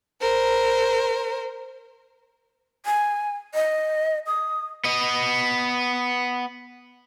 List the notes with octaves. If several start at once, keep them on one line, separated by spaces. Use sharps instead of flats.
A#4 C5
G#5
D#5
D#6
B3 D#5